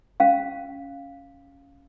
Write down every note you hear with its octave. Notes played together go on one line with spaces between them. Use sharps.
C#4 F5